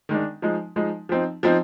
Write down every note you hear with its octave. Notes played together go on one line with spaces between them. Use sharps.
D#3 G#3 D4
F3 G#3 D#4
F3 G#3 D#4
F3 C4 D#4
F3 C4 D#4